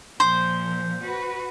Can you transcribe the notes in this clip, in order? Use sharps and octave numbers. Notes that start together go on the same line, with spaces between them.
A#2 F3 C5
F#4 B4